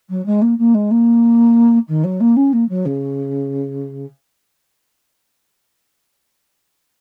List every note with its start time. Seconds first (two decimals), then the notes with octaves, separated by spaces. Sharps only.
0.09 F#3
0.25 G#3
0.41 A#3
0.58 A#3
0.74 G#3
0.91 A#3
1.88 D#3
2.04 F#3
2.20 A#3
2.36 C#4
2.52 A#3
2.69 F#3
2.85 C#3